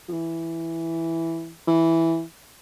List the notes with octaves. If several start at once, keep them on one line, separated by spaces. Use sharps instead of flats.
F3
E3
E3